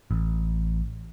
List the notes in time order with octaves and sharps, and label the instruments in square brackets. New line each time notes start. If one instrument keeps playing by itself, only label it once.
[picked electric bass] A1